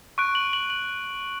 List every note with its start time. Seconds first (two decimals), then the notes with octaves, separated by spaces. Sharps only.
0.18 C#6 F#6 D7
0.35 F#7
0.53 F#7
0.70 F#7